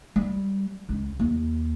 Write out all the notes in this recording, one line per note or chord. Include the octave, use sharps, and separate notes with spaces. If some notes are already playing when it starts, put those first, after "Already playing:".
G3
C#2
D#2